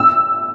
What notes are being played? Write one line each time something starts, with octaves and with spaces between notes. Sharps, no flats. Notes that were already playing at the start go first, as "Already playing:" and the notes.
Already playing: E6